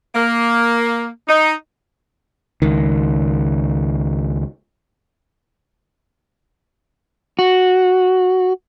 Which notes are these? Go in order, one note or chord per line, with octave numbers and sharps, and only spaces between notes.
A#3
D#4
C#2 D#3
F#4